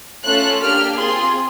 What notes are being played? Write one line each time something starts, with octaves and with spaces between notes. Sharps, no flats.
A3 C#4 F4 A4 F#6
A#3 D4 G4 F6
C4 F4 G#4 C6